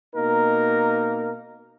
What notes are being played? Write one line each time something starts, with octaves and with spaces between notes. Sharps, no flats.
B2 A#3 D#4 A#4